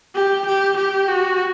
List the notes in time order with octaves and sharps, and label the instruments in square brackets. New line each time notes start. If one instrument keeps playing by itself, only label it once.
[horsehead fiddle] G4
G4
G4
F#4